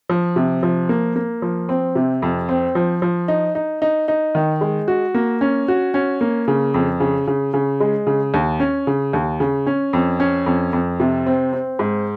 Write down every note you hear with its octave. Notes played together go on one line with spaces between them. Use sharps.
F3
C3
F3
A#3
A#3
F3
C4
C3
F2
C4
F3
F3
D#4
D#4
D#4
D#4
D#3
G#3
F#4
A#3
C#4
F#4
C#4
A#3
C#3
F2
C#3
C#3
C#3
G#3
C#3
D#2
C#4
C#3
D#2
C#3
C#4
F2
C#4
F2
F2
C3
C4
C4
G#2